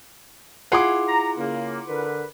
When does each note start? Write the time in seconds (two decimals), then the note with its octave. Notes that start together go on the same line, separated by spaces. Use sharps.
0.72 E4 F4 G#4 F#5 C6 D6
1.09 A#5
1.38 C#3 A#3
1.88 D3 A#4 B4